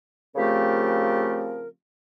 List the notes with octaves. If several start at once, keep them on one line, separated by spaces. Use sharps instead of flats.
C#3 F3 A3 C4 G4 A#4